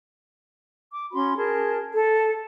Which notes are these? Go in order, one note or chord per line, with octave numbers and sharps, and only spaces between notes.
D6
C#4 F#4 B5 C6
G#4 A#4 A5
A4